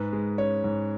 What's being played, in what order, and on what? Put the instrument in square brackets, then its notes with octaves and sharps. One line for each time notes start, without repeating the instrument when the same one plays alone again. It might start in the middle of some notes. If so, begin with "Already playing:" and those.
Already playing: [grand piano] G#2 B4
G#3
C#4 C#5
G#2